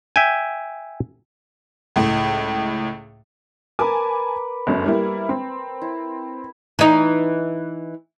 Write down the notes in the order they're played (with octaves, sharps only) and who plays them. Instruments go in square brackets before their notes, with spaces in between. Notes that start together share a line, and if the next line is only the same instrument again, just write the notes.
[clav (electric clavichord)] E5 G5 G#5
[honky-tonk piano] C#2 A2
[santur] A#4 B4 [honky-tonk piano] G#5 A5 D6
[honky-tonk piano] G1 F#2
G3 A#3 E4
C4
[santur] E4
[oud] E3 D#4